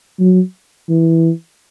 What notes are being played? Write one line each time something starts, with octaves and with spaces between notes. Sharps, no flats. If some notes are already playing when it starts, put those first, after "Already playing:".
F#3
E3